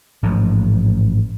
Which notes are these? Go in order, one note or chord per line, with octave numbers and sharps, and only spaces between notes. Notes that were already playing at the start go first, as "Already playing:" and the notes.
A1 G#2 F3